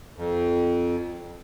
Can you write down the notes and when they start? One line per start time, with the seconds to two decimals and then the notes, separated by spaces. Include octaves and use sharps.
0.17 F2